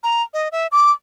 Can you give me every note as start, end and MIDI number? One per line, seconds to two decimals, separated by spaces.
0.03 0.22 82
0.34 0.48 75
0.52 0.67 76
0.72 0.91 86